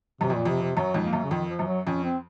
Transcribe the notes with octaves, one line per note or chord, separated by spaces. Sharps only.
F#2 C3
F2
A#2
F2 C3
C3
F#2 F#3
F2 G#2
A#3
F#2
C#3
F2 D#3
F3
F#2
F#3
F2 C#4
C4